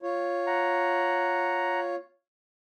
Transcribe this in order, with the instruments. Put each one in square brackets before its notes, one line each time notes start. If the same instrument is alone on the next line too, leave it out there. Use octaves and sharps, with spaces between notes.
[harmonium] F4 C#5
[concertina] F#5 A#5